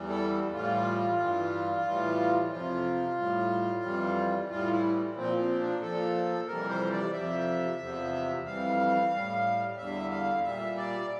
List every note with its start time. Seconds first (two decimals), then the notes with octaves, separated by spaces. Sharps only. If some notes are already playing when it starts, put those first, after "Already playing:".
Already playing: E2 E3 G3
0.09 A4
0.53 A2 E3 G3 F4
1.18 G2 E3 G3
1.85 A2 E3 G3
2.50 F2 C3 F3 F4
3.18 A2 G3
3.83 F2 E3 G3
4.49 A2 E3 G3 F4
4.71 E4
5.15 A#2 F3 C4
5.38 C4
5.59 D4
5.81 A#2 F3 A4
6.47 F2 C3 E3 G3 A#4
6.69 C5
6.91 D5
7.13 F2 C3 F3 E5
7.80 E2 C3 F3
8.46 F2 E3 G3 F5
9.12 A2 G3
9.77 E2 D3 G3 E5
10.10 F5
10.43 A#2 G3 E5
10.77 D5